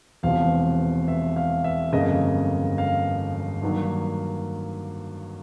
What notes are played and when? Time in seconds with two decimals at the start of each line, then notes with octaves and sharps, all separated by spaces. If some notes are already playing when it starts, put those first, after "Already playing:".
0.23 E1 E2 C3 F3 F5
1.08 E5
1.36 F5
1.64 E5
1.93 G1 F2 C#3 F#3 A#3 D#5
2.78 F5
3.62 G2 D#3 F#3 A#3